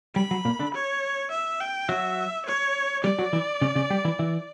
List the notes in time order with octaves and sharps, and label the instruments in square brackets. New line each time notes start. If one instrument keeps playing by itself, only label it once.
[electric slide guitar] G3 [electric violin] B5
[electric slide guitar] F#3
A#2 A#3
D3 D4
[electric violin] C#5
E5
G5
[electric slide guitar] F#3 F#4 [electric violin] E5
[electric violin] C#5
[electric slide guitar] G3 G4 [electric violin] D5
[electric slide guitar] F#3 F#4
E3 E4
C#3 C#4
C#3 C#4
G3 G4
E3 E4
E3 E4